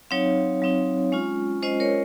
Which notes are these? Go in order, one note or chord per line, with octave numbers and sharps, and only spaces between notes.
F#3 C4 D#4 C#5 F5
F#3 C4 D#4
G#3 C#4 F4
G#3 C#4 F4 C5 D#5
A#4 C#5